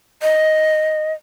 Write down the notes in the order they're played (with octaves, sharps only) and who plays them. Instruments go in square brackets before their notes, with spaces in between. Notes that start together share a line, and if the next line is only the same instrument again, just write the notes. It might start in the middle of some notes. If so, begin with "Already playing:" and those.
[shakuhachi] D#5